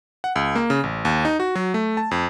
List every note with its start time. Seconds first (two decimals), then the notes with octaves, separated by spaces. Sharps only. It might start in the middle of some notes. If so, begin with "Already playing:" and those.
0.24 F#5
0.36 C#2
0.55 A#3
0.70 C#3
0.84 A1
1.05 D#2
1.25 D#4
1.40 F#4
1.55 F#3
1.74 A3
1.97 A5
2.11 F2